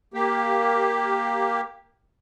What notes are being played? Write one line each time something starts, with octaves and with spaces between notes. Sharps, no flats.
A#3 G4